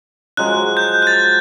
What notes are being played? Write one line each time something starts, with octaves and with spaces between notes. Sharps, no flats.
F3 F#3 G#3 F#6
G6
F#6 A6